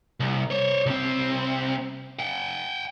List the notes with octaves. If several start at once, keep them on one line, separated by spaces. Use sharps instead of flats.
C2
C5 C#5
C2 C4
F#5 G5